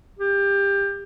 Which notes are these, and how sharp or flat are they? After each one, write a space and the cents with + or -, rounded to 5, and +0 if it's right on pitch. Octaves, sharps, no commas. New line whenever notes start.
G4 +25